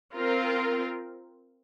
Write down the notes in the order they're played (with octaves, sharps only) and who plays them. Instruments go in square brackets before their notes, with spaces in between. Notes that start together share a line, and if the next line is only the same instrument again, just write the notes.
[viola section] C4 F4 A#4